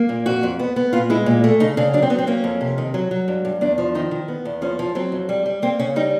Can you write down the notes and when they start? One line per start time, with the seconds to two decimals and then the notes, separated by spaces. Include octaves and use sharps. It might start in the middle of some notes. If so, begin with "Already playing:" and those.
Already playing: A#3
0.09 A#2
0.26 F2 F#4
0.43 F2
0.59 B3
0.76 B3
0.93 A#2 F4
1.10 G#3 E4
1.26 A#2
1.44 A3
1.60 C#3 D#4
1.77 C#3 D4
1.93 F#3 D4
2.02 C4
2.10 F#3 B3
2.19 C4
2.27 A#3 C#4
2.44 F2
2.61 C3
2.78 D#3
2.94 F#3
3.11 F#3
3.28 G2
3.45 G2
3.61 E2 D4
3.78 F3
3.95 D#3 D#4
4.11 D#3
4.28 B3
4.45 E2
4.61 F3 C#4
4.79 F3
4.95 F#3 C4
5.12 F2
5.29 G3
5.46 G3
5.62 A#3 C4
5.79 C#3 C#4
5.96 G3 D#4